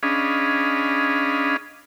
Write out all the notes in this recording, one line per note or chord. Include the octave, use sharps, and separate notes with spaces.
C#4 D4 G#4 D#5 F5 B5